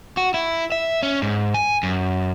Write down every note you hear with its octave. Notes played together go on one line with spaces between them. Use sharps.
F#4
E4
E5
C#4
G#2
G#5
F#2